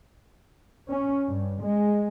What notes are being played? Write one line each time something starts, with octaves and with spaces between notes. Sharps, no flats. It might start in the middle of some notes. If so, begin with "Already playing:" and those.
C#4
G2
G#3